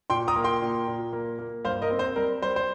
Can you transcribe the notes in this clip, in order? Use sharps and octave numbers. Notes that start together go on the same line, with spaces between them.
A#2 G5 C6
A#5 D#6
A#3
G5 C6
A#2
A#2
A#3
A#3
G2 C5 F5
A#4 D#5
C4
C5
G3 A#4
G3 C5
C5